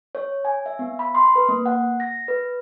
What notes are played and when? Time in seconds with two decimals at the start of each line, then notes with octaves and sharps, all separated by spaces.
0.15 C#5
0.45 G#5
0.66 E5
0.79 B3
0.99 B5
1.15 C6
1.36 B4
1.49 A#3
1.66 F#5
2.00 A#6
2.28 B4